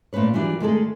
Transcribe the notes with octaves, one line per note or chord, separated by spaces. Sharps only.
A#2 A3 C#4 B4 C#5
D#3 E3 F#3 G3 D4 F4
D#3 G#3 A3 D4 G#4 A4